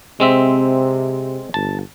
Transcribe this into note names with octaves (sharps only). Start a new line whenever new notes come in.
C3 G#3 C4 E5
G1 A5